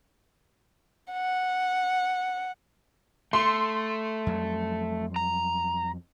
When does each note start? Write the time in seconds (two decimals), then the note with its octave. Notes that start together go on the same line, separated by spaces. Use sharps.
1.12 F#5
3.33 A3 C6
4.26 F2 F#3 G3
5.16 A#5